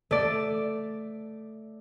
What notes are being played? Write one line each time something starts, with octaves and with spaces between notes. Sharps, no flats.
A3 D5